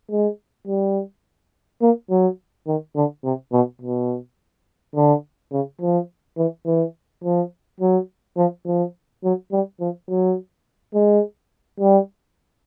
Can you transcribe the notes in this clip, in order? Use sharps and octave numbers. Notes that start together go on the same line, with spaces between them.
G#3
G3
A#3
F#3
D#3
D3
C3
B2
B2
D3
C#3
F3
E3
E3
F3
F#3
F3
F3
F#3
G3
F3
F#3
G#3
G3